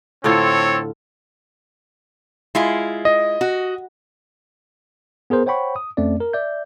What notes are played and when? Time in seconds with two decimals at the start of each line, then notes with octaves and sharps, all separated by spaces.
0.24 A2 D3 C4 F4 A4 C#5
2.55 G#3 E4 F4
3.05 D#5
3.41 F#4
5.30 B3 G#4 A#4 C5
5.46 C5 C#5 F#5 G5 B5 C#6
5.76 D#6
5.97 F2 A3 C4 C#4 D5
6.20 A#4
6.33 D5 E5 G6